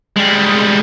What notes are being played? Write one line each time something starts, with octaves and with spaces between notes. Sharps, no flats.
G3 G#3